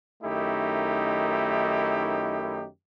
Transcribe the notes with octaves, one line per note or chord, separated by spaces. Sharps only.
F#2 D#3 A3 D#4 E4 G4